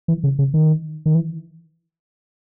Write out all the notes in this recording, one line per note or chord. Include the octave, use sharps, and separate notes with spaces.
E3
C#3
C#3
D#3
D#3
E3